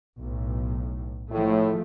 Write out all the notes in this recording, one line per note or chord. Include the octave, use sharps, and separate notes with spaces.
B1 A2
A2 F3 G#3 A3